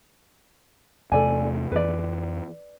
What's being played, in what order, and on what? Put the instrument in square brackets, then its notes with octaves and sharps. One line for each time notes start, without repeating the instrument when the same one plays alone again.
[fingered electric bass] E2 C3 A3 [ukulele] A4 D5 G#5
[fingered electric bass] F2 E3 [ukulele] B4 D5